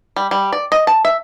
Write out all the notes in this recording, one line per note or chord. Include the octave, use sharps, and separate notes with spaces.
G3
G3
D5
D#5
A5
E5